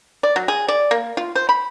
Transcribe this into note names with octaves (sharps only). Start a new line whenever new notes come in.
D5
F#3
G#4
D5
A#3
F4
C5
B5